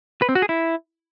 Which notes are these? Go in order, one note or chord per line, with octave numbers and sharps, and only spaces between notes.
B4
C4
F#4
G#4
E4